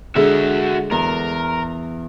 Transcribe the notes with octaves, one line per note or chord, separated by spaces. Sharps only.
D3 G#3 F#4 G#4 E5
E2 A#4